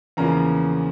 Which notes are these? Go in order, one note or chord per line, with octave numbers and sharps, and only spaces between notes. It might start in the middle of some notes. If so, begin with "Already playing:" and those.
E2 C#3 F3 A#3 C#4 A#5